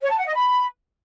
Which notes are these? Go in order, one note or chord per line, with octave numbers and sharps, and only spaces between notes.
C#5
A5
F#5
D#5
B5